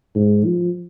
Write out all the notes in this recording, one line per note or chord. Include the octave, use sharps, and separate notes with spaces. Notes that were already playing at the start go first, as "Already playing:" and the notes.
G#2
F3